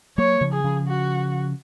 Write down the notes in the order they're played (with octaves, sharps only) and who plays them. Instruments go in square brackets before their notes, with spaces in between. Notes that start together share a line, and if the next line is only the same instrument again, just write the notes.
[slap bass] F#3 A#3 [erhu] C#5
[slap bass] C#3 F3
[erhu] G#4
[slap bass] C#3 F3
[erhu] F#4